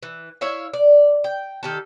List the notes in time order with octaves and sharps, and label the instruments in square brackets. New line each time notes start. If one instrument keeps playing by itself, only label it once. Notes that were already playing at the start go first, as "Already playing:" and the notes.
[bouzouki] E3
E4 C#5 E5 F5
D5
G5
D#3 G4 A4